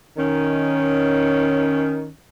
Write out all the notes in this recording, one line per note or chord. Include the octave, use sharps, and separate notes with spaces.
D#3 C#4